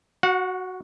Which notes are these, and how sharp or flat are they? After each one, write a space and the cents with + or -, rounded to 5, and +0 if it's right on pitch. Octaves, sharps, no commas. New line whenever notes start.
F#4 +0 F#5 -35